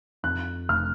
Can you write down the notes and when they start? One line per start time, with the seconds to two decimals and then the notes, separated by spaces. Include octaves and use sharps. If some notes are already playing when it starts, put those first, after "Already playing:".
0.23 F2 F#6
0.69 F1 F6